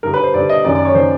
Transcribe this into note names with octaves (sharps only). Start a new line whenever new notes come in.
G2 D3 A#4
B4
C5
G2 D3 D5
D#5
F#2 D#3 D5
D5
C#5
D#3 C5